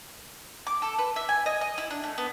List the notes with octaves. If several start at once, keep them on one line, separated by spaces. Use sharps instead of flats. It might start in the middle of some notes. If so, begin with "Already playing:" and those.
D6
A4
B4
E5
G#5
D#5
D#5
E4
D4
A3
B3